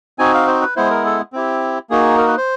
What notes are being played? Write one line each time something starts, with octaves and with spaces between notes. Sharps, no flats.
C4 D#4 F#4 G#5
F5
C5
B4
G#3 B3 E4 C5
A#4
A4
C4 E4 G4
A#3 D#4 F#4 G#4
A#4
B4
C5